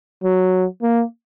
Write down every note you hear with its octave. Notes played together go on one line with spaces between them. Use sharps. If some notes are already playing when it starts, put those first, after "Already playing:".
F#3
A#3